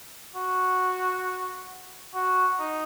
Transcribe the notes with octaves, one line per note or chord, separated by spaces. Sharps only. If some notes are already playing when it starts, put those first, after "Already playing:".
F#4
F#4
D#4